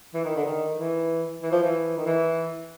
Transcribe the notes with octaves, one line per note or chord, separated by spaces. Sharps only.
E3
D#3
D3
D#3
E3
E3
F3
E3
D#3
E3